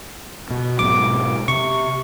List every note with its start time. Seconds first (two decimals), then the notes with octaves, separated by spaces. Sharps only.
0.50 B2
0.79 G#2 B2 F#3 D6
1.48 C3 C#6